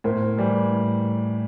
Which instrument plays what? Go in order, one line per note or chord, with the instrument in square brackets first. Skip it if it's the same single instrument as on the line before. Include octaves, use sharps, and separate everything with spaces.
[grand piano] A2 [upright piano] A#4 C5
[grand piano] E3 G3
A2